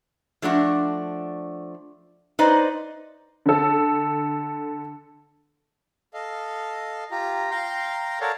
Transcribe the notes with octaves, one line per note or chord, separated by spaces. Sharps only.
F3 A3 D4 F#4
D#4 B4 C5 D5 D#5
D3 A4
A4 D#5 F5
F4 G4 A#5
F5 G5 A#5 C6
A4 A#4 C#5 D5 F5 F#5